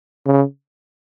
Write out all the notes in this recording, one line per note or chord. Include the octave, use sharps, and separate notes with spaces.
C#3